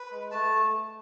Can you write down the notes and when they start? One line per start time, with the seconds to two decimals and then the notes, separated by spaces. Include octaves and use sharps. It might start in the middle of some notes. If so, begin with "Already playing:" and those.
Already playing: B4
0.12 G#3
0.31 A3 A5